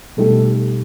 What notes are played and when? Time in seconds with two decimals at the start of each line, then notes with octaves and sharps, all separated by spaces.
0.17 B2 G3 A3 D#4 G4